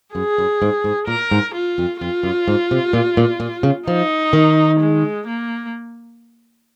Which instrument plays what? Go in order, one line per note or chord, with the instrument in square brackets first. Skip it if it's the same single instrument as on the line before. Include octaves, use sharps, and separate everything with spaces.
[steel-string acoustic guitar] F#2 [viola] G#4
[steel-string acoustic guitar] F#2
G#2
G#2
[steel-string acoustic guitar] A#2 [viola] A#4
[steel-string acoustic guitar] G#2
[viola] F4
[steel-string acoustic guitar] F2
[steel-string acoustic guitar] F2 [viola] F4
[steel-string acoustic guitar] F#2
G#2
C3
A#2
A#2
A#2
C#3
[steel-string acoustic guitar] F3 [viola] D#4
[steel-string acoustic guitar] D#3
[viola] G#3
A#3